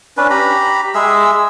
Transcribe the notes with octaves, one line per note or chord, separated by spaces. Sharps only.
C#4 D4 B4
G4 A#5 B5
G#3 G#4 E5 E6